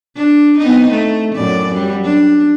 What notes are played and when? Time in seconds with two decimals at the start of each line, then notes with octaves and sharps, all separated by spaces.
0.16 D4
0.58 B3 C4 D#4
0.90 A3
1.36 F#2 A2 D5
1.71 F#2 F#3 G3
2.04 D4